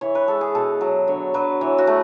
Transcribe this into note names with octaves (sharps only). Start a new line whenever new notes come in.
E3 C#5
B4
G#3 A4
G#4
B2 A4
F#3
D3 C#5
F#3 B4
E3 C#5
F#4
A3